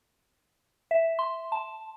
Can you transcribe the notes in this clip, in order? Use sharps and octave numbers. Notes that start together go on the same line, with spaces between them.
E5
C6
A5